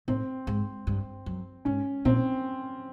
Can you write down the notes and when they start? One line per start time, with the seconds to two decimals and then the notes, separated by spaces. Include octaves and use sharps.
0.08 A2 C4
0.47 G#2
0.87 G2
1.26 F#2
1.65 G#2 C#4
2.05 A#2 C4